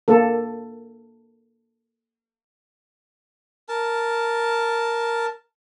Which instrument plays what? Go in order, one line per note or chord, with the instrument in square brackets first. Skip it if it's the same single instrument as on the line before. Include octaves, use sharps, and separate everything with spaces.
[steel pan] A#3 A4
[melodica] A#4 A5